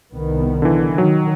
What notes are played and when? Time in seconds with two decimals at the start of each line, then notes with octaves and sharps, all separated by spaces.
0.12 C2 D#3 B3
0.62 D3 E3
0.98 D#3 F#3